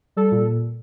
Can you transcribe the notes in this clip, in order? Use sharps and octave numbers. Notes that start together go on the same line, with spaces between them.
G3 A4
A#2